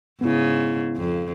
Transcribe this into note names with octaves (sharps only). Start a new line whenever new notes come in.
G#2 C#3 B3 E4
F2